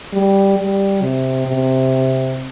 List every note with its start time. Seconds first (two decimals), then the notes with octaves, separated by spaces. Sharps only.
0.13 G3
0.58 G3
1.02 C3
1.47 C3